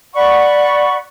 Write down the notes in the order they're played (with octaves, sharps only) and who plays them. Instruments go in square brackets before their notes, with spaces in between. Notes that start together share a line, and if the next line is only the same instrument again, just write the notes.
[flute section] D5 F#5 B5 C#6